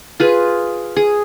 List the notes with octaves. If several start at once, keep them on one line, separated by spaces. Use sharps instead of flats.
F4 G#4 B4
G#4